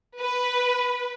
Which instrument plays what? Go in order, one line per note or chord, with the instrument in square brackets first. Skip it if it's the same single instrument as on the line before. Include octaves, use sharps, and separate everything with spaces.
[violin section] B4